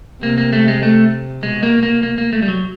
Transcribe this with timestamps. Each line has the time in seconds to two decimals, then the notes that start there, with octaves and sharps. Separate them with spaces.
0.22 C3 A#3
0.38 A#3
0.53 A3
0.68 G#3
0.83 A3
1.43 B2 G#3
1.63 A#3
1.83 A#3
2.03 A#3
2.18 A#3
2.33 A3
2.42 G3
2.48 F#3